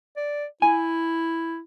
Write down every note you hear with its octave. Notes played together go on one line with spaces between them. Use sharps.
D5
E4 G#5